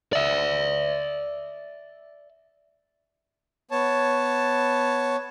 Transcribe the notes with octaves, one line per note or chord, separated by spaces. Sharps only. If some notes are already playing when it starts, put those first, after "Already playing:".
D5 E5
B3 C#5 A5